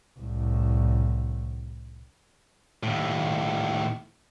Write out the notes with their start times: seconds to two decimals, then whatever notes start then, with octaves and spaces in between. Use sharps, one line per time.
0.19 C2 A2
2.83 D#2 A2